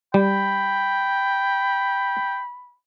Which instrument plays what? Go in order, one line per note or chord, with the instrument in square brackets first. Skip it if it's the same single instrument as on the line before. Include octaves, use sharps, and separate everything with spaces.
[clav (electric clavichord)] G3 [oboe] G5 [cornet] B5